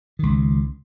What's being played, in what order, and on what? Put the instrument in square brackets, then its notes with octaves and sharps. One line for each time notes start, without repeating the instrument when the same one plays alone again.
[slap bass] C#2 D#3